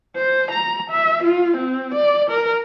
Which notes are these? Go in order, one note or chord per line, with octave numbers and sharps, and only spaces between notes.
C5
A#5
E5
F4
C4
D5
A#4